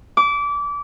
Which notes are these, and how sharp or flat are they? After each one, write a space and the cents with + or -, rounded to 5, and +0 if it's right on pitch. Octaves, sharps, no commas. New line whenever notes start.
D6 -25